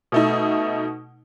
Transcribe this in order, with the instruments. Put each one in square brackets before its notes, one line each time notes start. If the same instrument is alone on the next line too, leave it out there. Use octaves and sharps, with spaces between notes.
[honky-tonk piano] B2 A3 D#4